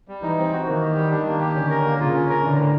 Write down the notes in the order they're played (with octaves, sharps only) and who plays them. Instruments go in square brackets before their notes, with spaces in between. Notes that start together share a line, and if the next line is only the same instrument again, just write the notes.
[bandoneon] G3
[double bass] E3 [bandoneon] D#4
[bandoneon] C4
F#4
[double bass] D#3 [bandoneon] A#3
[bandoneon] G4
G3
[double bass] D#3 [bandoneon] D4
[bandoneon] A#3
G4
[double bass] D3 [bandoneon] C#4
[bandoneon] A#4
A#3
[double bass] C#3 [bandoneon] F4
[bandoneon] C#4
A#4
[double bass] D3 [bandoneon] E3
[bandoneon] A2